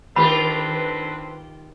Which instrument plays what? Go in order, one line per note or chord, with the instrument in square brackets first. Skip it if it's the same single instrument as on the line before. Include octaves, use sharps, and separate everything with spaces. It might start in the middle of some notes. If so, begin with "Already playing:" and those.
[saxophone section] D3 C4 B4 [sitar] D#3 F4 G4 [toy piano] B5